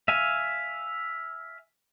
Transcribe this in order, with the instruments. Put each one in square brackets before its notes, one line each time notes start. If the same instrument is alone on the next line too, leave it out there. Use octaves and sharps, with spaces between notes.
[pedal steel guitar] E5 F5 G#5